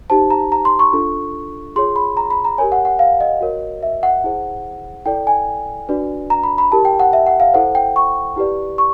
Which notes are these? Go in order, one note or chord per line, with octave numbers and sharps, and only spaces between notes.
D#4 G4 C5 A5
A#5
A#5
C6
C#6
D4 F4 A4
F4 G#4 C#5 C6
B5
A#5
B5
A#5
G4 A#4 C#5 G#5
F#5
F#5
F5
D#5
F#4 A#4 C#5
E5
F#5
E4 G#4 C5
E4 A4 D5 G5
G#5
D4 F#4 B4 D5
A#5
B5
B5
E4 G4 A#4 A5
G5
F#5
E5
F#5
F5
E4 A4 C5 F#5
G5
C#6
E4 G4 B4 D5
C#6